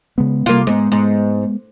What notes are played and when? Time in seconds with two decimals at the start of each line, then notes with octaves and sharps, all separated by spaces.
0.18 C#3 G#3 B3
0.46 C3 G3 A#3 F4
0.67 G#2 G#3 B3
0.92 G#2